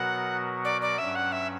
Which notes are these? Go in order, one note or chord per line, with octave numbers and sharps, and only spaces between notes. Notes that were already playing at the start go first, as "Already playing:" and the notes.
Already playing: B2 F#3 B3 F#4 A#4 F#5
D5
D5
G2 F#3 C#4 E5
F#5
E5